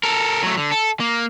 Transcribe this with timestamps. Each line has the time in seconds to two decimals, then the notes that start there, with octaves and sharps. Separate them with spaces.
0.03 A4 A#4
0.43 F#3 A3
0.57 D3
0.72 A4
1.00 A#3